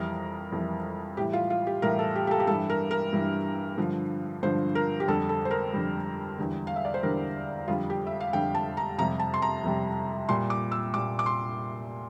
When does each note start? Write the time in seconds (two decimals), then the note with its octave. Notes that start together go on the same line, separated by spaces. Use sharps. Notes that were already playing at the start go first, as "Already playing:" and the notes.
Already playing: F2 E3 G3 A#4
0.52 F2 E3 G3
1.17 A2 E3 G3 G4
1.33 F4
1.50 F4
1.67 G4
1.82 A2 E3 G3 A#4
1.99 A4
2.16 G4
2.27 G4
2.31 A4
2.40 G4
2.47 G2 E3 G3 A4
2.70 A#4
2.91 A#4
3.13 G2 E3 G3
3.77 G2 D3 F3
4.43 G2 D3 F3 C5
4.75 A#4
5.00 G4
5.08 F2 D3 G3 A4
5.29 A4
5.45 C5
5.51 A#4
5.73 F2 D3 G3
6.38 E2 D3 G3
6.67 F5
6.76 E5
6.85 D5
6.94 C5
7.03 E2 D3 G3 A#4
7.68 F2 D3 G3 F4
7.90 G4
8.07 E5
8.20 F5
8.33 F2 D3 G3 G5
8.55 A5
8.77 A#5
8.98 F2 C3 G3 A#5
9.19 A5
9.34 C6
9.42 A#5
9.64 F2 C3 G3
10.29 A#2 G3 C6
10.50 D6
10.72 E6
10.94 A#2 G3 D6
11.19 D6
11.26 C6